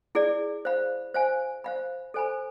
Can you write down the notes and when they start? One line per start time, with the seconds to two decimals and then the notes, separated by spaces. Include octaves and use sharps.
0.15 E4 G#4 D5
0.65 C5 F5 B5
1.14 C5 F5 G#5
1.64 C5 F5 B5
2.14 A4 C5 G#5 B5